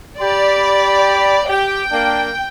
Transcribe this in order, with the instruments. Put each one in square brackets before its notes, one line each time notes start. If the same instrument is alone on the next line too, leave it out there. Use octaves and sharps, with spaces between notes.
[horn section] G4 B5 [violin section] D5
[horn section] G4 [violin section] G5
[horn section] A#3 D4